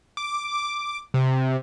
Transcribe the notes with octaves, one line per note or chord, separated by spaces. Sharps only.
D6
C3